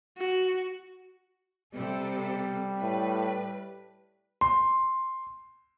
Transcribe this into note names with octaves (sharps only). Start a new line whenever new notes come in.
F#4
C3 G3 A4
A2 B4
C6